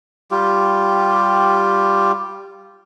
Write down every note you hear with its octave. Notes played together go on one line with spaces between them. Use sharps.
G3 F4 G4